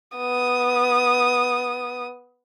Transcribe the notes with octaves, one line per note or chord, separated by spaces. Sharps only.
B3 D#6